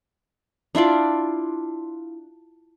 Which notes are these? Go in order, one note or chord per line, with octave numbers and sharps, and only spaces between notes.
D4 E4 F4 D5